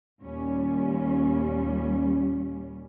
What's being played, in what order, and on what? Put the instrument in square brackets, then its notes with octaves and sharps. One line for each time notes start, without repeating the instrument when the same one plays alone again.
[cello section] D#2 A#2 G3 C#4